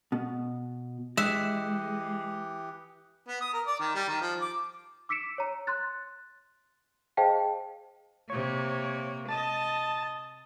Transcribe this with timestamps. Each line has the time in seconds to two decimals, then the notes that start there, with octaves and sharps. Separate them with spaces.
0.12 B2
1.17 E3 G#3 G4 E5 D#6 F#6 C#7
3.28 B3
3.41 D#6
3.53 A#4
3.67 D5
3.80 D#3
3.95 G3
4.08 D#3
4.21 F3
4.41 D6
5.09 D6 E6 B6 C#7 D7 E7
5.38 C#5 A#5
5.67 C6 F#6 A6
7.17 G#4 C5 D#5 F5 G5 A5
8.30 C3 A#3 C#5
9.29 D#5 A5